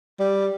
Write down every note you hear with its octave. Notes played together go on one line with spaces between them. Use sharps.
G3